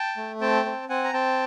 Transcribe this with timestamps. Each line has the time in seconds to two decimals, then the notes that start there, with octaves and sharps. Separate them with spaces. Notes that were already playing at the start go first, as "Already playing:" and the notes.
Already playing: G5 A5
0.17 A3
0.41 C4 G5 A5
0.65 C4
0.89 C4 F#5 G#5
1.04 A#5
1.13 C4 G5 A5